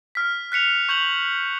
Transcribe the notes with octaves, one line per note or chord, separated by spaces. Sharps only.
F6 B6
F#6 B6 C#7 F7
C#6 G6 F7 F#7